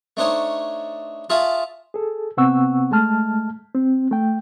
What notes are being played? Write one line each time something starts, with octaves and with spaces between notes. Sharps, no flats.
A3 D4 D#4 C5 C#5
F4 G#4 E5 F5 A5 C#6
G#4 A4
C3 B3 C4 F#5 C#6 E6
G#3 A3 A5 F6
C4
A3 G5